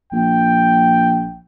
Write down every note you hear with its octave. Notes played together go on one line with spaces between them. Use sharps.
A#1 G5